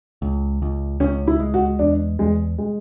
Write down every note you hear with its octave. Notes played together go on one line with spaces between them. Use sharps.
C#2
C#2
C#2 C#4
E4
G#3
F#4
E2 D4
E2 G#3
G#3